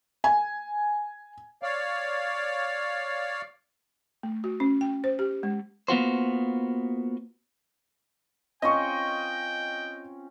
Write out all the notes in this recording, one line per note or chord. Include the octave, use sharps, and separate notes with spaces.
G#5
C#5 D5 F5
A3
F#4
C#4
G5
C5
G4
G#3
A#3 B3 F4 F#4 C5
C4 C#4 F4 D#5 G5 C#6